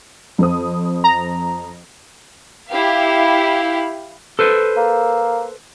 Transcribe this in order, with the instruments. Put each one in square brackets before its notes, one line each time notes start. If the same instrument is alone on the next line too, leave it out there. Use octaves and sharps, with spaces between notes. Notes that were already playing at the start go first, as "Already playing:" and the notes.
[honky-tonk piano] F2 C4 D#6
[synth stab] A#5
[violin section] E4 G4 F5
[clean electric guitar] A4 B4 C5
[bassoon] A#3